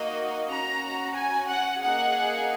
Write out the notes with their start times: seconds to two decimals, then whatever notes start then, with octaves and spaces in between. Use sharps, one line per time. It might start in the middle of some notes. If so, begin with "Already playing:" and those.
Already playing: A#3 D#4 F#4 D#5
0.50 C#4 F#4 A#5
1.16 G#5
1.49 F#5
1.81 A#3 D#4 G#4 F#5